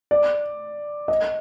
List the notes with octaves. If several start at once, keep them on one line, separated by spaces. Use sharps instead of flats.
D5
D#5